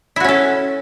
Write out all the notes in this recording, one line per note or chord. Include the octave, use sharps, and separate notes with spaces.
C#4 E4 F#4 A4